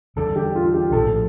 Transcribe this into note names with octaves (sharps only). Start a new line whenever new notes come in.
E2 D3 G3 A4
G4
F4
G4
A#1 A2 F3 A4